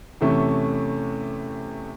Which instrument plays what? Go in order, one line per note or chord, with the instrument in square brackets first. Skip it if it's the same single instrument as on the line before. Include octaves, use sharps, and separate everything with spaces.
[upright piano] E2 C3 A3 C#4